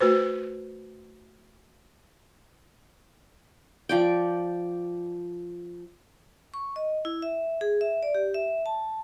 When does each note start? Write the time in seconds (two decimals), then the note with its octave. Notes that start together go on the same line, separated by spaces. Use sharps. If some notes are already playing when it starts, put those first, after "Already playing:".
0.01 A3 F#4 B4 C5
3.89 F3 D5 G5
6.54 C#6
6.76 D#5
7.05 E4
7.22 E5
7.61 G#4
7.81 E5
8.03 D5
8.15 G4
8.34 E5
8.66 A5